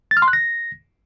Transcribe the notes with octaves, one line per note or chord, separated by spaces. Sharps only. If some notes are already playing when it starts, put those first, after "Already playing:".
A6
F6
C6
F#6
A#6